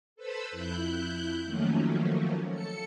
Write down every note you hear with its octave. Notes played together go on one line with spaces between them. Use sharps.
A4 B4 C5 B5 E6
F2 E4 F#6 G6
D#3 F3 F#3 A3 A#3 C#4
A4 C#7